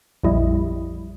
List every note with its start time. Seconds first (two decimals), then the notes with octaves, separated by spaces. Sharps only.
0.24 A#1 F2 G3 E4 D#5